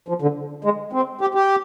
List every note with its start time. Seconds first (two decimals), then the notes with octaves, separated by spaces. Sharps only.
0.08 F3
0.22 D3
0.64 G#3
0.93 C4
1.21 G4
1.35 G4